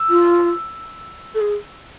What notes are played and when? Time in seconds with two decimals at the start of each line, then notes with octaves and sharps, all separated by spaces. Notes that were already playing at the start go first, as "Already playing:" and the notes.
Already playing: E6
0.10 F4
1.35 A4
1.41 G#4